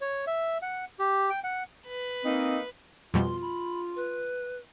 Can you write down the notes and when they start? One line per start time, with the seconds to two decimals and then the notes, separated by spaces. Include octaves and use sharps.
0.01 C#5
0.27 E5
0.62 F#5
0.99 G4
1.30 G5
1.44 F#5
1.87 B4
2.25 A#3 C4 D#4
3.14 F2 B2 G3 F4 C6
3.42 B5
3.96 B4